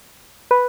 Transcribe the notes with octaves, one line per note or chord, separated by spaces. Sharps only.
B4